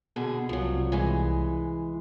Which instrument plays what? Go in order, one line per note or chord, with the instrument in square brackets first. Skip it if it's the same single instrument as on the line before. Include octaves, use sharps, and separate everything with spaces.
[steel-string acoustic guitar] B2 D3 G#4
[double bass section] C2 [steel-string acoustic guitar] F3 F#3
[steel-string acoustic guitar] E3 G#3